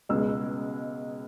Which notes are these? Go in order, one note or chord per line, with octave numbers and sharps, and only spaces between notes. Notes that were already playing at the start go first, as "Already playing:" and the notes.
C#2 B2 G#3 E6